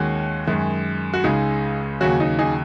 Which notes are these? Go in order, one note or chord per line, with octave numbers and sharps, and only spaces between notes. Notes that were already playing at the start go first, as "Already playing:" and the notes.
Already playing: D#2 D#3 G#3 C#4 F#4
F#2 D#3 G#3
F#4
C#2 C#3 G#3 D#4
D#2 C#3 F#3 C#4 F#4
D#4
D#4 G#4